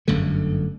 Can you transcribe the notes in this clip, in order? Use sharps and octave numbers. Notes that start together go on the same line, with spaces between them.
G1 F#2 D3 A3